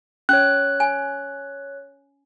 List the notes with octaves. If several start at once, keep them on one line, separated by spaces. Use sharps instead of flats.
C#4 C#5 F#6
G#5